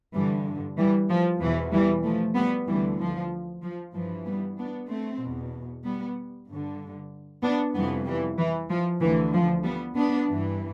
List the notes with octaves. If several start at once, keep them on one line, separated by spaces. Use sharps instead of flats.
G2 D3 E3 G3
E3 G3
F3
E2 B2 E3
E3 G3
F3 A3
G3 B3
D2 D3 E3 G3
F3
F3
G2 E3 F3
G3 B3
B3 D4
A3 C4
E2 B2
G3 B3
G2 D3
B3 D4
F2 C3 E3 G3 B3
E3 G3
E3
F3
D2 D3 E3
F3
G3 B3
B3 D4
G2 E3